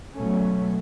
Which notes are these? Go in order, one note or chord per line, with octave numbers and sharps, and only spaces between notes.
B2 F#3 A3 C#4